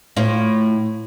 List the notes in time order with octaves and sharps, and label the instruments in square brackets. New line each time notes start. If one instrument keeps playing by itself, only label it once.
[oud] A2 F4